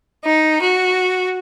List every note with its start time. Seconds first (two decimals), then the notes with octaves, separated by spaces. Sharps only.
0.23 D#4
0.61 F#4